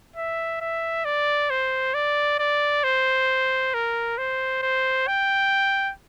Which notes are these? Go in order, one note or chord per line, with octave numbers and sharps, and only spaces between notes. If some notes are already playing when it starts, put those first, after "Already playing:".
E5
E5
D5
C5
D5
D5
C5
A#4
C5
C5
G5